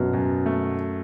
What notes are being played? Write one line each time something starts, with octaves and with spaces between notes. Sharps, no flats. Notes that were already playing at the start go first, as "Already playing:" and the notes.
Already playing: F#2 B2
F#2
A3